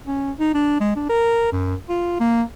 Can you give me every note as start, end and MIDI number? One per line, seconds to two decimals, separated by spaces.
0.07 0.31 61
0.39 0.52 63
0.54 0.80 62
0.80 0.92 56
0.96 1.05 62
1.09 1.48 70
1.52 1.74 42
1.89 2.20 65
2.20 2.43 58